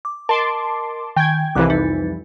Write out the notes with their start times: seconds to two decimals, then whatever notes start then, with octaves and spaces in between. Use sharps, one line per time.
0.05 D6
0.29 A#4 D#5 A5 C6 D6
1.16 D#3 G5 G#5 G6 G#6
1.55 C2 F2 E3 D6 F#6
1.70 D#4 A6